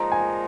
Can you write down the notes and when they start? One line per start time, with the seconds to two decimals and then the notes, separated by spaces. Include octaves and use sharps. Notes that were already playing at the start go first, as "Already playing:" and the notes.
Already playing: A#2 F3 G#3 D#4 A#5
0.12 G#5